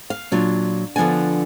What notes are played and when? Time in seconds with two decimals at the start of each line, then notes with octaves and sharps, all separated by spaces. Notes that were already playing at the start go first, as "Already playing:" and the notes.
0.10 F5
0.32 A#2 F#3 D4 F4
0.96 D3 F3 B3 D4 G#5